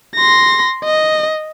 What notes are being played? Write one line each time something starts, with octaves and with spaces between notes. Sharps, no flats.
C6 A#6
D#5